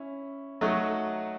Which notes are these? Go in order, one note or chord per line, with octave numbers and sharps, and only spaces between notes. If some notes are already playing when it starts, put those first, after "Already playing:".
Already playing: C#4 E4
F#3 A3 D#4 F#4